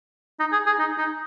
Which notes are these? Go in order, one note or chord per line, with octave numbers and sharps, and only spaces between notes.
D#4
G#4
G#4
D#4
D#4